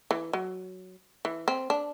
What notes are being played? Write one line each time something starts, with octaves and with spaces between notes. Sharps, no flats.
E3
F#3
E3
C4
D4